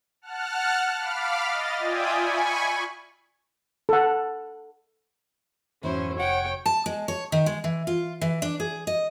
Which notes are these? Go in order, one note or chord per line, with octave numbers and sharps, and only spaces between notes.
F#5 A5 F6 F#6
F5 B5 D6 F6
D#5 A6
F4 D5 E5 G5 G#5 D#6
G#5 B5 C#6
A4 F#5
F2 G#2 E3 F#3 C#4 E4 C5
F1 C#5 F#5 G5
A5
G#3
C#5
D#3
G#3
E3
F4
E3
D4
G#4
D#5